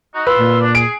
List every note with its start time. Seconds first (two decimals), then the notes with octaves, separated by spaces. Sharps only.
0.14 D#4 F#4
0.27 F4 B4 C6 E6
0.39 A#2
0.61 D4
0.75 G#4 D7